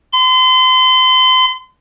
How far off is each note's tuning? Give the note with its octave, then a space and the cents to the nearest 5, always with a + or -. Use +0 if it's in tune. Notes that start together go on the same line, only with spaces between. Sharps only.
C6 -35